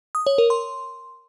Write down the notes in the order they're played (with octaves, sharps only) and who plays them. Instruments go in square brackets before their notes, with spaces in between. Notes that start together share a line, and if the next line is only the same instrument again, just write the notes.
[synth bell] D#6
C#5
A#4
C6